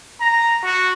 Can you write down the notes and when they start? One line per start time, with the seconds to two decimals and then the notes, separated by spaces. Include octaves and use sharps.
0.20 A#5
0.64 F#4